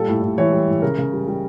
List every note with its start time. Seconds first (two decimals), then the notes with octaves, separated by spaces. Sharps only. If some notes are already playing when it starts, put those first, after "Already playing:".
Already playing: A#2 G3 A4
0.08 A2
0.22 A2
0.38 E3 C#5
0.53 G3
0.68 A2
0.82 C#3 A#4
0.98 C#3
1.13 G3
1.28 G3